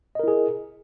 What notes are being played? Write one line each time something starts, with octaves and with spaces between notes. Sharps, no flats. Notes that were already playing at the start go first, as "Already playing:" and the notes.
E4 G#4 A#4 D#5